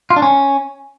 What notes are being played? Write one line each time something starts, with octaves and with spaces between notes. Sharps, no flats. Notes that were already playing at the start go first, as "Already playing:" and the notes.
F4
D4
C#4